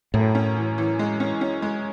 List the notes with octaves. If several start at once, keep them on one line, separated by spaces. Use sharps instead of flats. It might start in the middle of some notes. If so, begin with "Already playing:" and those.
F#2 A2
C#4
E3
E3
G#3
C#4
C#4
G#3